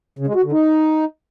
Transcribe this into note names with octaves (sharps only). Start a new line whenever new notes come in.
C#3
G#3
F#4
D3
D#4